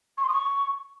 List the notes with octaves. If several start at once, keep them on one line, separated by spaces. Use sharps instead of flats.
C#6
C6
D#6
C#6